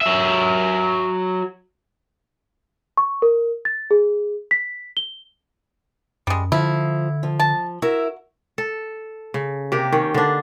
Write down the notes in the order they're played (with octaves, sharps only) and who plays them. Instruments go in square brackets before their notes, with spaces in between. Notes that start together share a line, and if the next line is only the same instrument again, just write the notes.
[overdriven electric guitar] F#3 E5
[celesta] C#6
A#4
A6
G#4
B6
G7
[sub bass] F#2 [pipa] G3 G#3
[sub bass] D3 [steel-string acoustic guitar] F3 [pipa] E4
[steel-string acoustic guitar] F3
[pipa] A5
[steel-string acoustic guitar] E4 A#4 E5 [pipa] F#4
[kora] A4
C#3
C3 A#3 G4
D#3 C#4
D3 D4